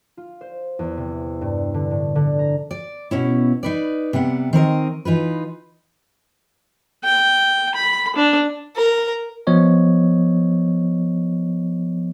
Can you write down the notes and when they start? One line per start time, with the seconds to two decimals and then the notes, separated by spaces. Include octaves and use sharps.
0.17 F4
0.41 C5
0.79 E2
0.97 C3
1.41 G2
1.74 D3
1.91 A2
2.15 D3
2.39 A#5
2.71 D5
3.11 B2 C#4 E4
3.63 D#4 B4 D5
4.13 C3 G3 B3 F#5
4.53 D#3 C4 A#4 D#5
5.05 E3 D#4 F4 B4
7.04 G5
7.75 B5
8.16 D4
8.76 A#4
9.47 F3 B3 C#5 D#5